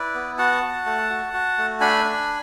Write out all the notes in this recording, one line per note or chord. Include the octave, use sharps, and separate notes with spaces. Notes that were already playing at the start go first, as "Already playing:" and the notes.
Already playing: E4 B4 D5
B3
F#4 F#5 A5
F#4
A3
F#4
F#4
A3
D4 G#5 B5
D4